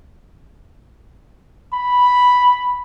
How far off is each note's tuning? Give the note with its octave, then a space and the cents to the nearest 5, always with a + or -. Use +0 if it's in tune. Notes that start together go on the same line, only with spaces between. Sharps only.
B5 +0